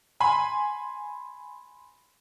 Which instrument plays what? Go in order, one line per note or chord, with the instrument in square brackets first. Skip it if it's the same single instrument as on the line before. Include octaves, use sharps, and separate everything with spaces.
[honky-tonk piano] G#5 B5 C6